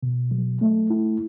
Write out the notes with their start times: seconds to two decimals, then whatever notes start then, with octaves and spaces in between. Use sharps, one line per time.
0.03 B2
0.31 F#3
0.61 A3
0.90 E4